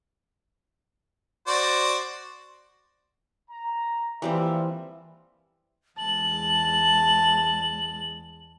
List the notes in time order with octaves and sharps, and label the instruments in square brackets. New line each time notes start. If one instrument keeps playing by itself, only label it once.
[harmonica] F#4 C5 D5
[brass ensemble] A#5
[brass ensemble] A#2 F3 E5 [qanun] E3 G3 C4
[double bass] E2 G#3 [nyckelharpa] A5 [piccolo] F#7